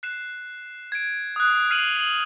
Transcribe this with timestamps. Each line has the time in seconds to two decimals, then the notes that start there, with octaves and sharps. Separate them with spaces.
0.03 F#6 C7 E7
0.92 G#6 D7
1.36 D#6 F#6
1.70 F6 C7 D#7 F7 F#7
1.97 C7 D#7 F#7